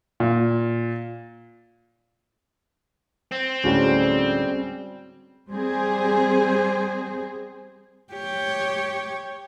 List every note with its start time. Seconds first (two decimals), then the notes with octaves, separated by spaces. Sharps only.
0.20 A#2
3.32 C4
3.64 D2 A2 G3 G#3 C#4 F#4 G5
5.49 G3 C4 G#4 C5
8.13 G4 C#5